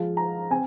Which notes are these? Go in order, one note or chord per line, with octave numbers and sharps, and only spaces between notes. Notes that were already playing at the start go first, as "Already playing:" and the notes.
Already playing: F3 G#3 F4
A#5
C4 G#5